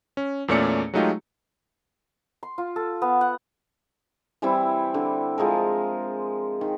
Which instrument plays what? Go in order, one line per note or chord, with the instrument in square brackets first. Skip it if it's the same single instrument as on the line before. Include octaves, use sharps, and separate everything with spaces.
[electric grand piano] C#4
E2 A#2 A3 C#4 D5 C#7
F#3 G#3 A3 D#4 F4 G4
[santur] C6
F4
A4
B3
F#5
[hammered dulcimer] E3 G3 C4 E4
D3
F3 G#3 G#4 A#4
D#3